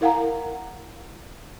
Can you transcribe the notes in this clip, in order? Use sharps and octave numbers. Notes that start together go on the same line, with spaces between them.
E4 A#4 F5 F#5 G#5 A#5